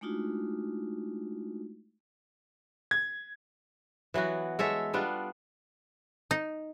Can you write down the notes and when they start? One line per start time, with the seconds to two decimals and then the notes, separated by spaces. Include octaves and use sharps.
0.01 G#3 A3 D4 D#4 F4 F#4
2.91 G#6
4.14 E3 F#3 B3 F#4
4.59 G#3 A4 C#5 E5
4.93 G3 B3 D4 F4
6.31 D#4